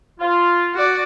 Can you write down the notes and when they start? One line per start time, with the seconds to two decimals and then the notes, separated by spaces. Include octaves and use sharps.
0.20 F4
0.74 F#4 D5